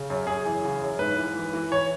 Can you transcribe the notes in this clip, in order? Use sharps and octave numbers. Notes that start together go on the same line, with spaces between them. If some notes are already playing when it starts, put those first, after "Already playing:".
Already playing: C#3
F#2
F#2 G#4
E3
C#3
F#2
G#2 B4
E3
E3
E3
C#5